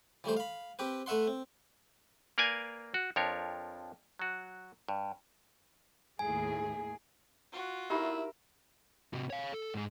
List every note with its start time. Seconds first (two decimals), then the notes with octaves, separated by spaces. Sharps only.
0.24 E3 G3 A3 C5
0.37 F5 B5
0.79 C4 G4 B4
1.06 A3 B4 E5 F#5 C6
1.27 C4
2.38 A#3 A#4 B4 D5 F5 G#5
2.94 F#4
3.16 F2 F3 D4 A#4 C#5
4.19 F#3 F#4
4.89 G2
6.19 D#2 A2 G#4 G#5
7.52 F4 F#4
7.90 D#4 E4 G4 A#4 E5 B5
9.14 C3 F#4
9.30 C#5 F5
9.53 A4
9.74 G#2 G#4